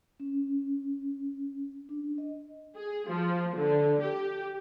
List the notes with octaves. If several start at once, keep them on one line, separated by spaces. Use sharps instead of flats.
C#4
D4
D#5
G#4
F3
D3
G4